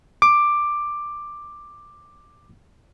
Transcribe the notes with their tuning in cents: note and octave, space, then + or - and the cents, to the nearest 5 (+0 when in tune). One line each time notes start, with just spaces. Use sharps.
D6 +10